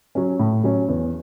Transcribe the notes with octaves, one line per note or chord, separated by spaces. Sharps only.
F#3 C#4
A2
F#3 C#4
E2